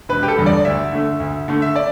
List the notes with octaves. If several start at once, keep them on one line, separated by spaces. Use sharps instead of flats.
E1 B4
G4
A4
E2 D3 G3
D5
D2 E5
D3 A3
D2
D3 A3
E5
D5